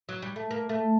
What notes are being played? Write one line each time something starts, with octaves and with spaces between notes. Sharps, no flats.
F#3
G3
A3
A#3
A3